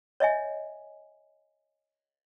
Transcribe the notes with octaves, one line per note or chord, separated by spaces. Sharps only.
C#5 D#5 E5 G#5